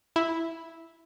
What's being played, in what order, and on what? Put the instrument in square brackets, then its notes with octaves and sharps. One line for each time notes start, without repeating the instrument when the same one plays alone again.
[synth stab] E4